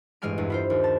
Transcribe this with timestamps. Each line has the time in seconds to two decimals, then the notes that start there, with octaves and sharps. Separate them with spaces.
0.22 A1 G2 G#3 G#5 F6 D7
0.38 E2 G2
0.50 E4 F4 C5
0.70 D#2
0.84 A5